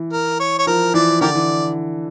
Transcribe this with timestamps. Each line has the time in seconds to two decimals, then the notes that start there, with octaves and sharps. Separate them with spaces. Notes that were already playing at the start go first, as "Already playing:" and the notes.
Already playing: E3
0.13 A#4
0.40 C#5
0.59 C#5
0.67 F3 A#4
0.94 E3 D5
1.21 D3 G4 A#4 D5
1.35 E3